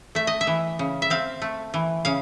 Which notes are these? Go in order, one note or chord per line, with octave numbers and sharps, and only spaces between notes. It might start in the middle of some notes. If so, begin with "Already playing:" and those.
A3 E5
D#5
E5
E3
C#3
E5
C4 F5
A3
E3
C#3 F5